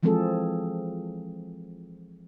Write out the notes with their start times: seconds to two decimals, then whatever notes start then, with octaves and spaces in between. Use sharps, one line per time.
0.03 E3 F3 G#3 C4 G#4 A4